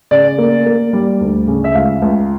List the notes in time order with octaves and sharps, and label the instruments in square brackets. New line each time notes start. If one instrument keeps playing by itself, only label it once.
[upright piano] C#3 D5
A#3
A#3
G3
D2
C#3
E5
C#2 F5
C#2